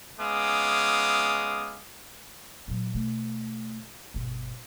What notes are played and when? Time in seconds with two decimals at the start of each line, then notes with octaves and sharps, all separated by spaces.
0.20 G#3 B3 C#4 F5 D6 D#6
2.68 A#2 F#3
2.94 B2 A3
4.14 G1 B2